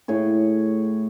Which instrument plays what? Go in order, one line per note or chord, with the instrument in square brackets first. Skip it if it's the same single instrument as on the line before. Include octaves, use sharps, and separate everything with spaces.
[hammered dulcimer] A2 G#4 C#5